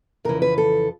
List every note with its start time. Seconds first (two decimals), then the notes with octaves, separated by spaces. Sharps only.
0.25 F2 C#3 E3 A#4
0.42 B4
0.58 A4